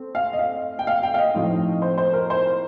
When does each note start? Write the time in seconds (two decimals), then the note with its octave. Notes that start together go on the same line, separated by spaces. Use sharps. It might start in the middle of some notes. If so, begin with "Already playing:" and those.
Already playing: A3 C4
0.15 F5
0.33 D#5
0.39 F5
0.79 G5
0.87 F5
1.03 G5
1.14 F5
1.18 D#5
1.34 A2 F3 C4 D#4
1.82 C5
1.98 C5
2.13 A#4
2.30 C5
2.46 A#4